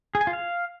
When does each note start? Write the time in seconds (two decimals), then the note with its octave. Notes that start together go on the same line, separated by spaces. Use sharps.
0.15 G#4
0.21 G#5
0.27 F4
0.33 F5